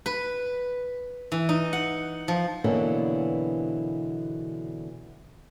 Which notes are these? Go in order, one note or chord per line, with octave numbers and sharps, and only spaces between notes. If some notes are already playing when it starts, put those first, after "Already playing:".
B4
E3
D#4
F#5
F3
B2 D3 E3 F#3 A#3